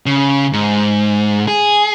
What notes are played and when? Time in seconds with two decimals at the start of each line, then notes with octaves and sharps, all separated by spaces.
0.06 C#3
0.53 G#2
1.48 G#4